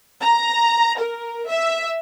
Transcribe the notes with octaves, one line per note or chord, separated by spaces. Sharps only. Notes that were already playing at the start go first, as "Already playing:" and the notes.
A#5
A#4
E5